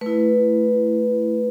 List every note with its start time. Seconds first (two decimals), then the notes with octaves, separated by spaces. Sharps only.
0.01 A3 E4 B4